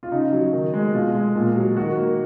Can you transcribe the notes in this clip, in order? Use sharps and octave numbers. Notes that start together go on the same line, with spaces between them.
F4
C#3 D#4
F#3
D#3
G#3
B2 F4
G#3
A#2
F#3
D#3 F#4
A#3